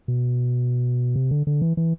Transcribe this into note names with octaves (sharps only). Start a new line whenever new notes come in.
B2
C3
D3
D3
E3
E3